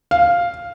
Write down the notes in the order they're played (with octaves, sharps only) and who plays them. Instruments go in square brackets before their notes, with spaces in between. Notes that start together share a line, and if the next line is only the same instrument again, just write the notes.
[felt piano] F5